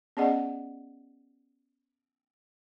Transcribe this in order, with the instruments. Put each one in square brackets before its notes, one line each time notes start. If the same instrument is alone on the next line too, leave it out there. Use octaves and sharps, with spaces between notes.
[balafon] B3 C#4 G#4 D5 D#5 F#5